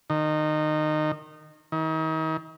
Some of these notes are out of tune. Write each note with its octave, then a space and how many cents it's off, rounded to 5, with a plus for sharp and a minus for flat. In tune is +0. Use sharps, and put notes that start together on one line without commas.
D#3 -20
D#3 +40